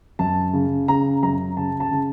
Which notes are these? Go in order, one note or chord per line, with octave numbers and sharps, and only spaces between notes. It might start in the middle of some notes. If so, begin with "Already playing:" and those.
F#2 A5
C#3
C#3 A#5
F#2 A#5
C#3 A5
A5
C#3